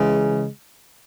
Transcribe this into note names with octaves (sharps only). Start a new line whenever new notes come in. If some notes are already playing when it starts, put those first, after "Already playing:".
Already playing: C#3 E3 G#3